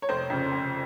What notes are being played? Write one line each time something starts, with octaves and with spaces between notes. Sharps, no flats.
C#5
F1 C5
F2 C#3
F1